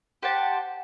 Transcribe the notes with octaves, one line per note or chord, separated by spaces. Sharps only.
G4 C5 F#5 A5